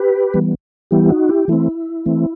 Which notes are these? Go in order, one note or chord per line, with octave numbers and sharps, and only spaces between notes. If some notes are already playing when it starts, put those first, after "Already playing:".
Already playing: G4 B4
E3 G3 B3
E3 G3 B3 E4 G4
D#4 F#4
E4 G4
E3 A3 C4 E4
E3 A3 C4